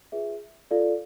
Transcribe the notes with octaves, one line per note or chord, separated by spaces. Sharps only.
F4 G#4 B4 E5
F4 A4 D5 F5